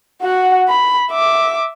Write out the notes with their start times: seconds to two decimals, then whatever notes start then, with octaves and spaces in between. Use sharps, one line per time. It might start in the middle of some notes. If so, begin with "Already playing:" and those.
0.23 F#4 F#5
0.69 B5
1.11 E5 D6